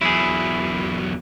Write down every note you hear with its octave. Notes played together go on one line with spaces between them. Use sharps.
E2 F#3 E4 G#4